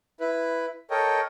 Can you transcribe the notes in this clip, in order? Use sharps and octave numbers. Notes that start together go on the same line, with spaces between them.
E4 B4
A4 A#4 C#5 D#5 G5